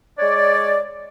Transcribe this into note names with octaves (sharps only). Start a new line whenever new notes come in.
G#3 C#5 D5